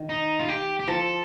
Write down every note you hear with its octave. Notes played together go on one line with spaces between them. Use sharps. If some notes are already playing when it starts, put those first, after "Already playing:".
Already playing: D#3
D#4
F4
G4
G4
F3 A4